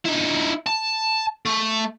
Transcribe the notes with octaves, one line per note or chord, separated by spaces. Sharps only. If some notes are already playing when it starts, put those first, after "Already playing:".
D#4 E4
A5
A3